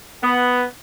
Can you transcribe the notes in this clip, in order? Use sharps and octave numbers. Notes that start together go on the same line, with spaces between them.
B3